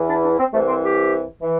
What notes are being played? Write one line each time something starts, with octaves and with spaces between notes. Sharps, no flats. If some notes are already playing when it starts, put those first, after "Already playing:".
Already playing: E2 E3
D4
D4
C4
C2 C3 E3 A3
C4
G4
E3